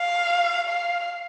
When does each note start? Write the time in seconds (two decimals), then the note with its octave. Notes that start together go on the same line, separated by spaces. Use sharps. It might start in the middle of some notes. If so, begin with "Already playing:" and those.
Already playing: F5
0.68 F5